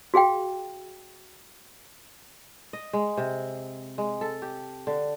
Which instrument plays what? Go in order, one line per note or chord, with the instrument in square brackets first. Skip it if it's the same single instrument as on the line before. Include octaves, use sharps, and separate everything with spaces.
[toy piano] F#4 G#4 F5 G5
[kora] D#5
G#3
C3
G#3
A4
G4
D3